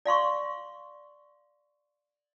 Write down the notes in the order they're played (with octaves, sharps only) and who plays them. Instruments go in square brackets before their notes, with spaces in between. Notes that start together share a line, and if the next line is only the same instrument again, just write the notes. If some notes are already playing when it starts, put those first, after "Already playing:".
[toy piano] D5 F5 C6 C#6